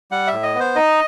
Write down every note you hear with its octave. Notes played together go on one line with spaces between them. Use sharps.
G3 F#5
E5
A2
D#5
B3
C5
D#4 D#5